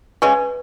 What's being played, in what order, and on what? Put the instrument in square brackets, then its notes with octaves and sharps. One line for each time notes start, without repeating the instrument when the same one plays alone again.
[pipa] C#3 G#3 C#4 [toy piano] B4